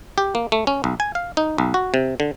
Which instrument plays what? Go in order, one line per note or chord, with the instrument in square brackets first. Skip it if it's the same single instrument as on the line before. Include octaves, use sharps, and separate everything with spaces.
[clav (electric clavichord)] G4
A#3
A3
C#4
B1
G#5
F5
D#4
B1
F#4
C3
D3